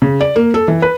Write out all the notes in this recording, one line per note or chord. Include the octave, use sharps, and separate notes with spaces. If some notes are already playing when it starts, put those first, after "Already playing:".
C#3
D5
A#3
A4
E3
B4